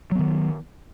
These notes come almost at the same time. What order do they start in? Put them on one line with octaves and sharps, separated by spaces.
F#3 B3 D#3